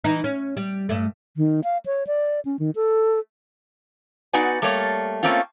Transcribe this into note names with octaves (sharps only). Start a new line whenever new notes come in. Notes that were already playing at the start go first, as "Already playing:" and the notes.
E3 D#4
C#4
G3
G2 A3
D#3
F5
C#5
D5
C#4
D#3
A4
B3 D#4 F#4 B4 D5 G#5
G3 A3 A#3 C#5
A3 A#3 C4 C#4 F4